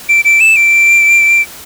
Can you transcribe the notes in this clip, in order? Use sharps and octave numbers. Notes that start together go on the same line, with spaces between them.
D7
D7
E7
D7